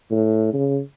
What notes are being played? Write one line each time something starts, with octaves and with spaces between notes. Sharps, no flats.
A2
C#3